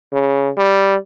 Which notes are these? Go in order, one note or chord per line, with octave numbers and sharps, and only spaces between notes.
C#3
G3